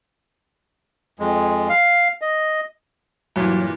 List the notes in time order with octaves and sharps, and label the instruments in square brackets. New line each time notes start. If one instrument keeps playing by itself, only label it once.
[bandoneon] F2 G#3
F5
D#5
[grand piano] G2 A#2 E3 [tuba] F#3